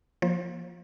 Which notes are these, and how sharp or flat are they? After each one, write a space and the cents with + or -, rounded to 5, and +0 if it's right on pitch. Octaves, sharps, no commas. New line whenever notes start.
F3 +0 A#3 +25 C5 +35